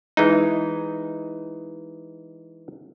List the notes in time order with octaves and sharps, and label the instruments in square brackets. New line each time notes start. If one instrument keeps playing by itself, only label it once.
[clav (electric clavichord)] E3 G#3 D#4